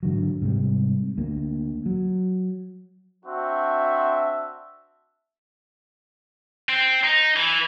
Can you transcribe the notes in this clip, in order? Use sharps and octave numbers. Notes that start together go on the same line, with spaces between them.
G#2 D3 F#3
G#2 C3 G3
D2 A#3
F#3
C4 D4 F#4 E5
C4
D#4
E3